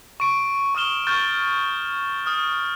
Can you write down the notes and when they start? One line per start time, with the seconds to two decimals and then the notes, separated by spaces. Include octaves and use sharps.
0.20 C#6 D7
0.75 C#6 D#6 F6 E7 G7
1.07 C#6 F6 G6 A6
2.26 D#6 F6